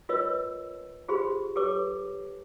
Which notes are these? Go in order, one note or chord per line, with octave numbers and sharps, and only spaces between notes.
F4 A#4 B4 C#5 D#5 E6
F4 G4 G#4 C5 B5 C6
G4 A4 B4 C#5 D6